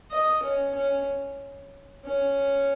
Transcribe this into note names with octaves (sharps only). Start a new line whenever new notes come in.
D#5
C#4
C#4
C#4